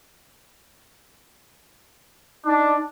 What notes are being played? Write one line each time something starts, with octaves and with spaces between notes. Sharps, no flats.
D4 D#4